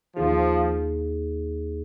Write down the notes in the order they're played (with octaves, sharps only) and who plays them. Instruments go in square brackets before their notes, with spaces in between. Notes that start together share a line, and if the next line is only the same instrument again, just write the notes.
[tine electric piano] D#2 D#3 A#3 D#4 G#4 [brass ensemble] F3